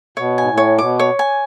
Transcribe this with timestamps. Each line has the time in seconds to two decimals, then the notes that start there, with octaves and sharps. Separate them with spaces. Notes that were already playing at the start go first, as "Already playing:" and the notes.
0.17 B2 C#5
0.38 G#2 G#5
0.48 A2
0.58 C#5
0.78 B2 D6
0.99 C#5
1.19 G#5